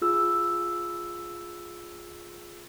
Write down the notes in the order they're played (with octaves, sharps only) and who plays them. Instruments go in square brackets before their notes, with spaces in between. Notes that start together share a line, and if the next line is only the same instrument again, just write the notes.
[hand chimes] F4 G#4 E6